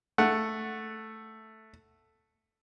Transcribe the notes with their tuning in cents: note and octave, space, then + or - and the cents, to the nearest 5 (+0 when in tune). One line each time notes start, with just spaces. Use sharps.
A3 +0 F#5 +0